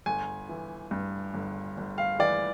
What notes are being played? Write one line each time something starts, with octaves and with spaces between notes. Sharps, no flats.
G1 G#5
E3
G2
G1
G1
F5
E3 D5